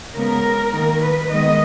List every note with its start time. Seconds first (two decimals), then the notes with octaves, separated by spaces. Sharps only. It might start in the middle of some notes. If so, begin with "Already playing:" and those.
0.15 C#3 G#3 B3 A#4
0.72 D#3 A#3
1.01 B4
1.30 D#3 G#3 B3 D#5